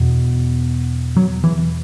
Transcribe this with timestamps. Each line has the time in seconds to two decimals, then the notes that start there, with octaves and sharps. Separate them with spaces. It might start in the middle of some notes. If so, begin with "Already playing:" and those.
Already playing: E2 B2
1.16 F#3
1.44 E3